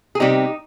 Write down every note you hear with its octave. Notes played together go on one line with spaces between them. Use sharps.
G#4
C3 G3 C4 D#4 G4